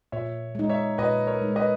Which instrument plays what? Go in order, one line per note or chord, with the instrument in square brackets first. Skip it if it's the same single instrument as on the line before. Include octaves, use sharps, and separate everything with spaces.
[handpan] A#2 [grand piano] C#5 E5
[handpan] G#3 D#4
[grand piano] C#5 E5
[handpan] A#2 [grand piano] B4 D#5
[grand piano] A#4 C#5
[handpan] G#3 D#4
[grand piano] B4 D#5